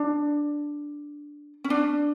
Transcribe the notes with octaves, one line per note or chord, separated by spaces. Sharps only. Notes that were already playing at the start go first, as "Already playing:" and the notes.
Already playing: D4
C#4
D4